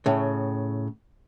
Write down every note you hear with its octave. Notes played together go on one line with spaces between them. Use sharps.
A2 C#3